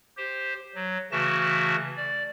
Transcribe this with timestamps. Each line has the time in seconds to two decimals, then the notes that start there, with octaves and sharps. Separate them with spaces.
0.17 G4 C5
0.75 F#3
1.12 C#3 E3 A3 F#4 A5 A#6
1.97 D5